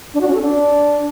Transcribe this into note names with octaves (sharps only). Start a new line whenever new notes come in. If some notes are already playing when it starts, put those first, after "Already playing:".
D4
F#4
C#4
A4
D4